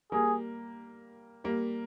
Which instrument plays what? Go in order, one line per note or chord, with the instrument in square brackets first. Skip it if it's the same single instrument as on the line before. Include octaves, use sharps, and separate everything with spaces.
[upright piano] G3 A#3 [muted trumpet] G#4
[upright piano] G3 A#3